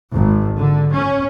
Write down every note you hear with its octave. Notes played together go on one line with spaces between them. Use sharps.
G#1
D3
C#4